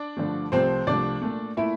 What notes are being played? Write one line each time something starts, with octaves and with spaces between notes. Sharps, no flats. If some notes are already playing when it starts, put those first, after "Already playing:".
Already playing: D4 D5
G2 D3 F3 A3
C2 C3 F3 A3 C4 C5
C2 C3 F3 A3 D4 D5
A#2 A3
A#2 A3 E4 E5